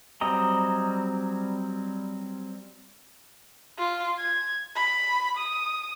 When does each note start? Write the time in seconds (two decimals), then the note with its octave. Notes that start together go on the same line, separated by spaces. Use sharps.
0.21 F#3 G3 C4 D#5 A#5
3.79 F4
4.19 G#6
4.76 B5
5.38 D#6